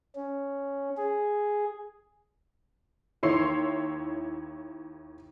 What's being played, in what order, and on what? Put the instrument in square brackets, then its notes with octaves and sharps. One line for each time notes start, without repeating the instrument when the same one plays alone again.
[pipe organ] C#4
G#4
[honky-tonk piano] D#2 E4 C#5 C6 C7